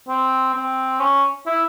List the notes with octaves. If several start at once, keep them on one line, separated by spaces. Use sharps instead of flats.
C4
C4
C#4
E4